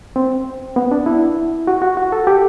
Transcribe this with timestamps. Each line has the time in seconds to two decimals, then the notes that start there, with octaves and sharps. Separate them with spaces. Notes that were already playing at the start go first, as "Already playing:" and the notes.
0.16 C4
0.76 B3
0.91 D4
1.06 E4
1.67 F#4
1.82 F#4
1.97 F#4
2.12 A4
2.27 G4